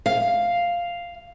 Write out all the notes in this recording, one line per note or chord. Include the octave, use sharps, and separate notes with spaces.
F5